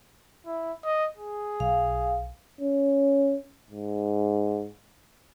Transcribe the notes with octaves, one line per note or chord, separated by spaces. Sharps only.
E4
D#5
G#4
B1 F5
C#4
G#2